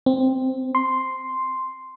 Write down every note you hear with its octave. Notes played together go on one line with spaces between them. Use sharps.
C4
C6